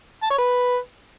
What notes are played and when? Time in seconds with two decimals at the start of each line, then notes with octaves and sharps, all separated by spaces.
0.22 A5
0.30 C#5
0.38 B4